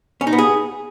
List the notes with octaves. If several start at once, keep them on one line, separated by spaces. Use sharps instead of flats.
C#4
D#4
B3
G#4